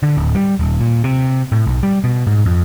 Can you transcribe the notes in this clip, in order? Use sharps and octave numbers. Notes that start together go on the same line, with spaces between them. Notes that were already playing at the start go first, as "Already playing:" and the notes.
D3
D1
G3
D#1
A#2
C3
A2
B1
G3
B2
G#2
F2